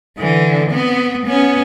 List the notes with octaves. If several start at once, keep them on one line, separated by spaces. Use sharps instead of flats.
D3 E3
B3 C4
B3 C#4